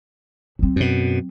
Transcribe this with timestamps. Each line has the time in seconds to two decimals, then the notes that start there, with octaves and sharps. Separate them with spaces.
0.59 F#3 C4
0.76 F#2 B2